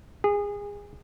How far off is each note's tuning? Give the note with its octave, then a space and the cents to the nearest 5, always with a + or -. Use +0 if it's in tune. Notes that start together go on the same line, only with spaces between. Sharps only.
G#4 -25